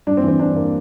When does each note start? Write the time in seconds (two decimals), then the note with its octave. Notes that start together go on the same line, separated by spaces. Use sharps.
0.07 G2 D4
0.17 C4
0.23 E3
0.28 C4
0.39 G2 D4
0.56 A#3